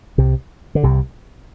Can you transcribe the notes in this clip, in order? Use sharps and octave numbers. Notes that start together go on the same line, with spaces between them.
C2 C3
D3
C2 C3